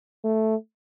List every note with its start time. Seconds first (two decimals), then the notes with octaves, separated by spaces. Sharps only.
0.24 A3